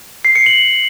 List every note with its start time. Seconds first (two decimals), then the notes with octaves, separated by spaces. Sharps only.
0.25 C7
0.35 C#7
0.46 F#7